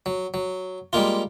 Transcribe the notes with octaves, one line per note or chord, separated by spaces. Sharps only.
F#3
F#3
G3 G#3 A#3 F4